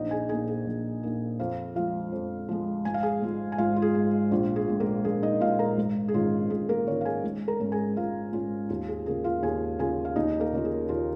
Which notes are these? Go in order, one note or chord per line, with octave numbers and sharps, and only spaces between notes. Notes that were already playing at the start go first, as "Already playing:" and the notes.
Already playing: A#1 D#4 D#5
G#4 G#5
A#2 A#3 D#4 G#4 G#5
G#4
A#1
A#2 A#3 D#4
F2 F4 F5
F3 G#3 F4 F5
F2
F3 G#3
G#1 G#5
F5
G#4 G#5
G#2 G#3 F4
G#5
G#1 F4 F5
F4
G#4
G#2 G#3 F4
A#1 F4
G#4
A#2 G#3
A#3 A#4
A#1 G#4
D#4 D#5
A#2 G#3 F4 F5
A#4 A#5
G#1
G#4
G#2 D#3 C#4 F4
G#1 G#4
A#3 A#4
G#2 D#3 C#4 F4 C#5
F5
G#4 G#5
G#1
A#4 A#5
G#2 G#3 C#4
G#4 G#5
G#1 F4 F5
G#2 G#3 C#4 F4
D#2 F4
G#4
C#3 A#3 F4 G#4
F4 F5
D#2 G#4 G#5
C#3 A#3 F4 G#4 G#5
F5
D#2 D#4 D#5
A#3 A#4
C#3 A#3 F4
G#4
D#2 F4